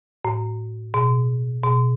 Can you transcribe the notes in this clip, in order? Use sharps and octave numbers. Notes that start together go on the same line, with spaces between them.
A2
B2
B2